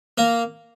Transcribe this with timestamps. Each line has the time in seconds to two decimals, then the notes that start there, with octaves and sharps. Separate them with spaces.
0.18 A#3 A#4